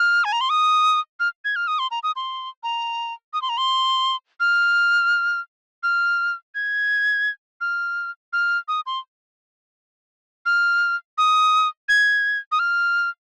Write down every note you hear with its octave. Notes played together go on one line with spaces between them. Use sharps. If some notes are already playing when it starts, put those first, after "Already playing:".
Already playing: F6
G#5
A#5
C6
D#6
F6
G#6
F6
D#6
C6
A#5
D#6
C6
A#5
D#6
C6
A#5
C6
F6
F6
G#6
F6
F6
D#6
C6
F6
D#6
G#6
D#6
F6